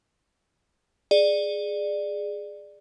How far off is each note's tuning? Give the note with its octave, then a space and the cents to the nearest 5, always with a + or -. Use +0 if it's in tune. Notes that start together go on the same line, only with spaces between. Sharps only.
G#4 +0 D5 +15